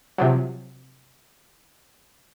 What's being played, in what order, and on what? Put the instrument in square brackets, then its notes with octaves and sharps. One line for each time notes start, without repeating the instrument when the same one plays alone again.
[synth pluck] C3 F3 F#3